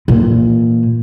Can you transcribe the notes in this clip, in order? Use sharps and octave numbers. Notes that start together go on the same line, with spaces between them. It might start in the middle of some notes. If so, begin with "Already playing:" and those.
A#2 E3